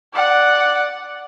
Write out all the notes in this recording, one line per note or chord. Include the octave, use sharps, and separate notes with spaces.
D5 F#5